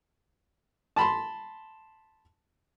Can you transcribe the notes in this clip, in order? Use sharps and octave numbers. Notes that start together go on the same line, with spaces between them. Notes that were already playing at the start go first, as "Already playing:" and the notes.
A5 B5 C6